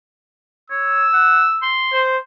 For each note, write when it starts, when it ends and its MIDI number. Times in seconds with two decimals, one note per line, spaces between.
0.70 1.05 73
0.70 1.72 88
1.13 1.44 78
1.62 2.04 84
1.93 2.17 72